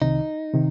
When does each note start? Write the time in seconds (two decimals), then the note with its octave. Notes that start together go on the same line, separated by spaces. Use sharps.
0.02 C2 C3 D#3 D#4
0.53 C3 D#3